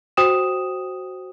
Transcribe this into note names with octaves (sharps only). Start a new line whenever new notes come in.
F#4 C5 G5 D#6 E7